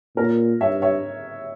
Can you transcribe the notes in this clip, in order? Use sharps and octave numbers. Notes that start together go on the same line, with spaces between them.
A#2 A#4 C#5
G2 C#5 E5
C#5 E5